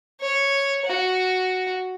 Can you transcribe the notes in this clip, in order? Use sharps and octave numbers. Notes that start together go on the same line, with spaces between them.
C#5
F#4